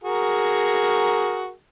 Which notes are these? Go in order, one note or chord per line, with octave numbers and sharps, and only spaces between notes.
F#4 G#4 A#4